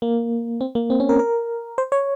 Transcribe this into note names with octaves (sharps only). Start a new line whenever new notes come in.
A#3
C4
A#3
C4
C#4
A#4
A#4
C5
C#5